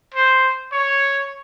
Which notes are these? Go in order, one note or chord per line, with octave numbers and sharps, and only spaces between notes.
C5
C#5